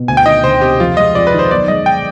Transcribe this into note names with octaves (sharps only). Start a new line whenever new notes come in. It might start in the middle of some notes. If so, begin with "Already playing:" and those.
Already playing: B2
D2 G#5
G5
D#3 D#5
D2 C5
C3 G4
F2 F4
G#3 D#5
F2 D5
B4
D#3
C5
B1 D5
G#3 D#5
G5